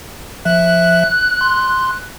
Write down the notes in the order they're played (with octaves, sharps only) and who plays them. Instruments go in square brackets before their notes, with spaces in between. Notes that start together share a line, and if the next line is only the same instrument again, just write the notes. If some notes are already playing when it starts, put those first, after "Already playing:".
[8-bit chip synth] F3 E5 [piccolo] F#6
[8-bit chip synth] C6